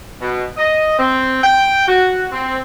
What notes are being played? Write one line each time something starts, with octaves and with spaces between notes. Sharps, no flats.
B2
D#5
C4
G5
F#4
C4